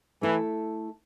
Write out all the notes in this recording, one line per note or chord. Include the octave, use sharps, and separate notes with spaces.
E3 A3 E4 A4